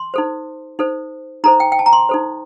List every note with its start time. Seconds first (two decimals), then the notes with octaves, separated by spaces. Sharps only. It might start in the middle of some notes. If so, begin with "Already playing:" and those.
Already playing: C6
0.14 D#4 A4 C5
0.79 D#4 A4 C5
1.44 D#4 A4 C5 A#5
1.60 G5
1.72 G5
1.79 A5
1.86 A#5
1.93 C6
2.09 D#4 A4 C5